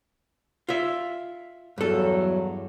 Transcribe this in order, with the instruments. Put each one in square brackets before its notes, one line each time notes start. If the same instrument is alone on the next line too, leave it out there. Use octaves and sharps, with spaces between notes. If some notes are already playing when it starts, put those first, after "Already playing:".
[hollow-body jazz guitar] F4 E5
[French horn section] E2 F#3 [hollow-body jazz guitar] G2 A4